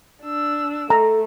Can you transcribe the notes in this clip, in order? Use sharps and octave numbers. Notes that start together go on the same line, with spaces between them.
D4 E6
A3 A4 A#5